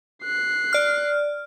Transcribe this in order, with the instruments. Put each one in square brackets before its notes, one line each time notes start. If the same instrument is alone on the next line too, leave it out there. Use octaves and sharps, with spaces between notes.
[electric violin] F#6 C7
[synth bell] D5 F6